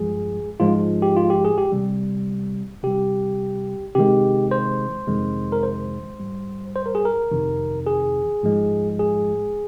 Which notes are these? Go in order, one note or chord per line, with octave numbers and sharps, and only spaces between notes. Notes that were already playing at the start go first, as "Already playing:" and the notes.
Already playing: G2 F3 G#3 G#4
G#2 F3 G#3 F4
G4
F4
G4
G#4
G4
C3 G3
C3 G3 G4
C3 D#3 G#3 G4
C5
F2 C3 D#3 G#3
A#4
C5
G#2 G3
C5
A#4
G#4
A#4
F2 C3 D#3
G#4
G#2 F3 G#3
G#4